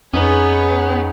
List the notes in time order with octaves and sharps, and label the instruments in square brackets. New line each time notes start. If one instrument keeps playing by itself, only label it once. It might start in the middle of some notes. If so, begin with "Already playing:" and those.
[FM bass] F2 [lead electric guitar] B3 [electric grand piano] C#4 D#4 B4 [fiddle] G#4 C#5